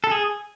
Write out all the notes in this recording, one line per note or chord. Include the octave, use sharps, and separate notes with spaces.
A4
G#4